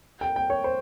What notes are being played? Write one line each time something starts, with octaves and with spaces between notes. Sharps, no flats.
G5
G5
C#5
C5